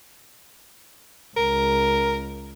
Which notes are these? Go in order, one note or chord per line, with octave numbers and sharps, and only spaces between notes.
C#2 A#4